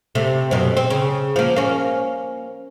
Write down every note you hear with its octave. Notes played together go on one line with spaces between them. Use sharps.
C3 A3
F#2 B2
C4
C#3
F3 A#3
A#3 C#4